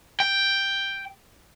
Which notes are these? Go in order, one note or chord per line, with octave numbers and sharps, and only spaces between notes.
G5